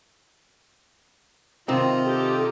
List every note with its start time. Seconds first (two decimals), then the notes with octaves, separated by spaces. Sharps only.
1.68 C3 D#3 C4 F4 D#5 A#5
2.04 G4 A4